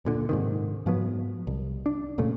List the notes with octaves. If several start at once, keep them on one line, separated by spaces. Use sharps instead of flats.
D1 A#2 D3
G#2 C3 D#3
G#2 F3 F#3 B3
C2
D4
F1 A#2 C#3 A3